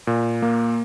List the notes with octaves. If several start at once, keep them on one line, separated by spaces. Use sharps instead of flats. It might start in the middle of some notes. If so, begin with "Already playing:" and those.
A#2
A#3